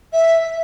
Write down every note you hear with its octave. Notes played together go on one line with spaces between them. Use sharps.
E5